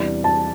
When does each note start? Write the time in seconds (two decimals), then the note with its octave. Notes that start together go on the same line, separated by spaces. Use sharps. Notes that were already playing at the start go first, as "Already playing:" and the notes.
Already playing: E2 C3 E3 G3 D4
0.24 A5